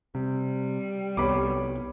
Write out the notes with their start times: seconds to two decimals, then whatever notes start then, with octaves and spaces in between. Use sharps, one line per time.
0.15 C3 G3
1.17 C2 B3 C#5 B5 D6